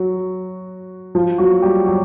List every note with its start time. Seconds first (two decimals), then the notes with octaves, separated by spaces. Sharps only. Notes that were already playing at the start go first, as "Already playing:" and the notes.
Already playing: F#3 F#4
1.15 F3 F4
1.38 F#3 F#4
1.62 G3 G4
1.86 F#3 F#4